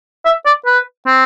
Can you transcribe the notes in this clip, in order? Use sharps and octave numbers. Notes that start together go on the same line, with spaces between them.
E5
D5
B4
C4